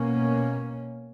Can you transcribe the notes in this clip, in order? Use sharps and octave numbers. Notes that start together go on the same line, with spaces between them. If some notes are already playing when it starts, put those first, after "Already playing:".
Already playing: B2 A#3 C#4